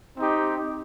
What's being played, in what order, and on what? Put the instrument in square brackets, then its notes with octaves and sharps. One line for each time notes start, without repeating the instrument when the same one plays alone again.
[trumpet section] C4 D#4 G4